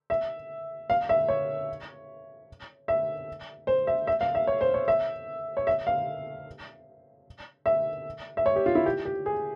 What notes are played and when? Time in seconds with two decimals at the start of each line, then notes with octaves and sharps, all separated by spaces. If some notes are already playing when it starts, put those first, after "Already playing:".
0.10 E5
0.90 F5
1.09 E5
1.28 C#5
2.88 E5
3.67 C5
3.87 E5
4.07 E5
4.21 F5
4.35 E5
4.47 C#5
4.61 C5
4.74 C#5
4.88 E5
5.57 C#5
5.67 E5
5.87 F5
7.66 E5
8.37 E5
8.46 C#5
8.56 G4
8.66 F4
8.75 E4
8.86 G4
9.05 G4
9.26 G#4